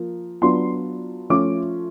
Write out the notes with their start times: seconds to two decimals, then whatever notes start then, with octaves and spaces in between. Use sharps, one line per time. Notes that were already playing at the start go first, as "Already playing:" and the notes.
Already playing: F3 A#3
0.42 F#3 B3 D4 F4 C6
1.30 F3 A3 C#4 F4 D6